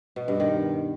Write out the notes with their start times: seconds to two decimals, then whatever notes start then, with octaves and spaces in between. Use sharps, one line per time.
0.16 B2
0.28 G2
0.40 D#3